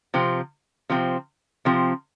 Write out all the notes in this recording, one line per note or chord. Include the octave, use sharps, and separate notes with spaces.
C3 F3 C4
C3 F3 C4
C3 F3 C4